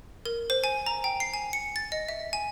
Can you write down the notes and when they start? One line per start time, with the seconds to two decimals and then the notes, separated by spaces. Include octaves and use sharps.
0.25 A#4
0.50 C5
0.64 G#5
0.86 A#5
1.04 G5
1.20 C7
1.34 G#5
1.53 C#7
1.76 A6
1.92 D#5
2.09 E5
2.33 G#5